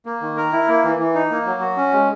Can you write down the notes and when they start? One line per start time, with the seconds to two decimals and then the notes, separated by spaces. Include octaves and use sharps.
0.06 A#3
0.21 D#3
0.37 A#4
0.52 E4
0.68 A#3
0.84 E3
0.99 E3
1.15 D#4
1.31 A#3
1.46 F#3
1.61 F#4
1.77 C#4
1.93 G#3